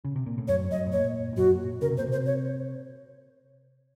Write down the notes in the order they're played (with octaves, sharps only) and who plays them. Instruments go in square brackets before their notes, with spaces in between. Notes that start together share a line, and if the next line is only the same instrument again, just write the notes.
[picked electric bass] C#3
C3
A#2
A2
[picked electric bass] F#2 [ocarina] C#5
[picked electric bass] F#2 [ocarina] D#5
[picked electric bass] A2
[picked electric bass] A#2 [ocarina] C#5
[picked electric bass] A2
[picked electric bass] F#2 [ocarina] F#4
[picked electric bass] A#2
[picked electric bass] C#3 [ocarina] A#4
[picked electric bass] C3
[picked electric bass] A#2 [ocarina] C5
[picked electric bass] C3
[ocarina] C5
C#5